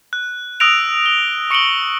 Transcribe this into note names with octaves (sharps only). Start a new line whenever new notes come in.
F#6
D#6 E6 F#6 A#6 D7 F7
G7
C#6 C#7 D7 F#7 G7